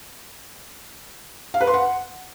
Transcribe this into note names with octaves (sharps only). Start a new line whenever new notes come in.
F5
B4
C6
F#5